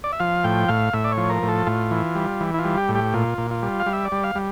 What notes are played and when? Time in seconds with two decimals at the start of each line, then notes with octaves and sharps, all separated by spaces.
0.04 D5
0.13 E5
0.20 F3 F5
0.44 A2 G5
0.68 A2 F5
0.93 A2 E5
1.04 D5
1.12 C#5
1.18 F3
1.30 A#4
1.43 A2
1.49 A4
1.67 A2 F4
1.91 E3
2.15 G3
2.41 E3
2.54 E4
2.59 F4
2.65 G3
2.77 G4
2.89 A2
2.95 G4
3.14 A#2 F4
3.38 A#2
3.51 F4
3.63 G3
3.80 F5
3.86 G3
3.93 E5
4.05 D5
4.12 G3
4.24 F5
4.35 G3